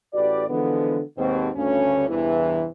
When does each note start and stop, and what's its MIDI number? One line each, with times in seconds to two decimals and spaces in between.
0.13 0.44 33
0.13 0.44 66
0.13 0.44 67
0.13 0.44 71
0.13 0.44 74
0.49 1.00 50
0.49 1.00 52
0.49 1.00 53
0.49 1.00 56
0.49 1.00 59
1.17 1.49 39
1.17 1.49 44
1.17 1.49 47
1.17 1.49 60
1.55 2.06 38
1.55 2.06 43
1.55 2.06 49
1.55 2.06 61
2.08 2.65 40
2.08 2.65 43
2.08 2.65 48
2.08 2.65 52